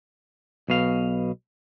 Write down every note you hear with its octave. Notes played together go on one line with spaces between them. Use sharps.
B1 B2 F5